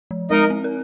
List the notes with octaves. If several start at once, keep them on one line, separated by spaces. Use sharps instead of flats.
F3
G#3 D#4 A#4 D#5
C4
A#4